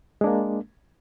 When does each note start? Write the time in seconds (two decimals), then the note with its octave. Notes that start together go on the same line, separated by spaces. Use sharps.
0.21 G#3
0.24 D4
0.27 A#3